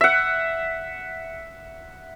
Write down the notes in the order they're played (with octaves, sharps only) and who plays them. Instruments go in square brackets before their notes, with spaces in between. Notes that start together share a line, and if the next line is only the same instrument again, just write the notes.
[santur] E5 F#5